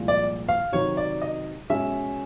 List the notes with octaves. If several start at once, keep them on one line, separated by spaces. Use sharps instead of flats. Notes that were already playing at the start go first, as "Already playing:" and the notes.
Already playing: C2 A#2 F3 G#3
D5
F5
C3 D#3 F#3 C#5
D5
D#5
B2 G#3 C#4 E5